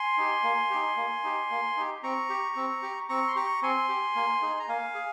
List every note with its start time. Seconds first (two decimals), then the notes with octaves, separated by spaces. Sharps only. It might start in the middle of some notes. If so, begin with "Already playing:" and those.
Already playing: G#5 C6
0.18 D#4 G4
0.43 A#3
0.70 D#4 G4
0.97 A#3
1.23 D#4 G4
1.50 A#3
1.77 D#4 G4
2.03 C4 A#5 C#6
2.30 G4
2.56 C4
2.82 G4
3.09 C4 A#5 C#6
3.28 C6
3.36 G4 A#5 C#6
3.62 C4 G#5 C6
3.89 G4
4.16 A#3
4.42 D#4 G#4
4.59 A#5
4.68 A#3 F5 G#5
4.95 G#4